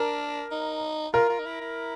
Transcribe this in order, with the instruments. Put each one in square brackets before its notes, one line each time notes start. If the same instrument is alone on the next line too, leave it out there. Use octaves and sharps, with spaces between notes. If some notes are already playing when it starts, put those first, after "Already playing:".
Already playing: [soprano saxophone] D4 [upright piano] A#4
[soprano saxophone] D#4
[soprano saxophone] F4 [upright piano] A#4
[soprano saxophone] F4
D#4
E4
E4